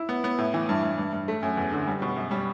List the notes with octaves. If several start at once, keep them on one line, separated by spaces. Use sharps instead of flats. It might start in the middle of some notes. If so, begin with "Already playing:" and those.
Already playing: E4
B3
B3
A2
E3
G2
G2
G2
G2
A3
F#2
E2
D3
G3
B2
F#2
G3